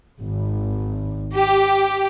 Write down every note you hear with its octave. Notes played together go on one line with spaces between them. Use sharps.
G#1
G4